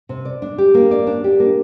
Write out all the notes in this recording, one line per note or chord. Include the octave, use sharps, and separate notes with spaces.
C3
D5
D4
G4
A#3
D5
D4
G4
A#3